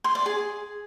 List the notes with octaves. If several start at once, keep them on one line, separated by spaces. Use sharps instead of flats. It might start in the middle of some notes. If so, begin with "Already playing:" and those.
C6
D5
G#4